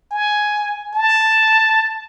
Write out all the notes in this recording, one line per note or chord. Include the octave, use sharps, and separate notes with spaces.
G#5
A5